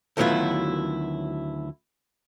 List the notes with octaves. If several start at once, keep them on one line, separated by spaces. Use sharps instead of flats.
D2 D#3 F#3 B3 E4 F4